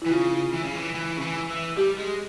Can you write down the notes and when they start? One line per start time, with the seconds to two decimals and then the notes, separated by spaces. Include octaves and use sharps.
0.02 E3 E4
0.11 C#3 F4
0.53 E3
0.64 C#3
0.76 E3
0.95 E3
1.17 C#3
1.22 E3
1.50 E3
1.77 G3 G4
1.98 G#3